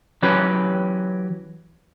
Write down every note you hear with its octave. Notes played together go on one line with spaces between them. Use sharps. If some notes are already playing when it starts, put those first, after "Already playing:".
E3 F#3 C#4 G4 B4